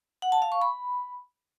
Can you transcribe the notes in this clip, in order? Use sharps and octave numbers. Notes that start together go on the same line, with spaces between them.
F#5
A5
F5
C#6
B5